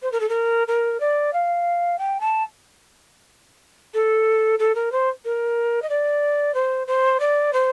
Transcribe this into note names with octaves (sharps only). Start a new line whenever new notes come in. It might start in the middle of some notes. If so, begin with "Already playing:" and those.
C5
A#4
A4
A#4
A#4
D5
F5
G5
A5
A4
A4
A#4
C5
A#4
D#5
D5
C5
C5
D5
C5